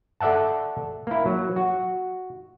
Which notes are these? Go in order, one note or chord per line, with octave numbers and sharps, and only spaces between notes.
A4 D5 E5 F#5 A5
A#3 E4
F#3
F#4